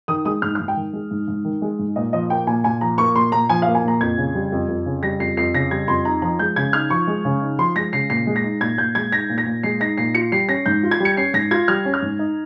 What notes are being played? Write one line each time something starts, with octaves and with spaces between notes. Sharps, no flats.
D#3 D#6
G#3 D#6
G#2 F6
F6
G#2
G5
D#3
G#3
G#2
G#2
D#3
G#3
G#2
A#2 D#5
F3 D#5
A#3 G5
A#2 G#5
A#2 G#5
F3 A#5
A#3 C#6
A#2 C6
A#2 A#5
F3 G#5
F5
A#3
G#5
A#2 A#5
F2 G#6
C#3
G3
F2
F2
C#3
G3 A#6
F2 C7
F2 C7
C#3 A#6
G3 G#6
F2 C6
D#4 A#5
F3 A#5
G#3 G6
C#3 G#6
D#4 F6
F3 C#6
G#3
C#3
D#4
F3 C6
G#3 A#6
C#3 C7
A#2 C7
G#3
A#6
D#4
A#2 G#6
A#2 G6
G#3 G#6
D#4 A#6
A#2
A#6
A#2
G#3 C7
D#4 A#6
A#2 C7
F4 C#7
G3 C7
C#4 A#6
G#2 G6
F4
G#6
G3 C#7
C#4 C7
G#2 A#6
F4 G#6
G3 F6
C#4
F6
G#2
D#4